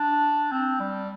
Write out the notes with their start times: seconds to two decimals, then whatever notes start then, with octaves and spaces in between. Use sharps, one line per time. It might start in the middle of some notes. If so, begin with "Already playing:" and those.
Already playing: D4
0.52 C4
0.80 G3